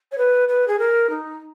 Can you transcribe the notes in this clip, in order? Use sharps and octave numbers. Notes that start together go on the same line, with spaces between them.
C#5
B4
B4
G#4
A#4
D#4